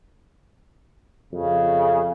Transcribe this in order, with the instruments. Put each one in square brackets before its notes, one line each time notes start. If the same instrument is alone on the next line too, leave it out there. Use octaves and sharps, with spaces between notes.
[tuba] F2 [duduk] C#3